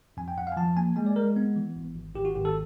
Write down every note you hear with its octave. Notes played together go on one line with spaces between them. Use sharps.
F2 G#5
G5
F2 F#5
F5
G#5
F3 A5
A#3 G#5
G#3 G#5
D5
G#3 A#4
B3
E3
G#1
G#1
G#1 G4
F#4
G#1 G4
A4